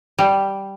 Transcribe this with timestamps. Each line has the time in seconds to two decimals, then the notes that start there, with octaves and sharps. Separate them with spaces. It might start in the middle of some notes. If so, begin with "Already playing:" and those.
0.19 G3